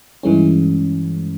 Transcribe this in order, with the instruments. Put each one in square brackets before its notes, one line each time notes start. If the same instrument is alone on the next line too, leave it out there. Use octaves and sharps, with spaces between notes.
[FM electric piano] G2 E3 G#3 C#4